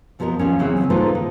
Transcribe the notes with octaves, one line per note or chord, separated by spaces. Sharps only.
F2 F3 B3 A4 A#4 D#5
D#2 F3 C#4
C#3 E3 F#3 C4
A#3 D#4 F4 A4 B4 C5
D#3